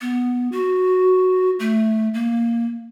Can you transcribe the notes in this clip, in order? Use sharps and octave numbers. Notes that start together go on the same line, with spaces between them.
B3
F#4
A3
A#3